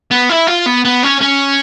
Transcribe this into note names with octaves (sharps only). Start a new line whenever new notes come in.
B3
E4
F4
B3
B3
C#4
C#4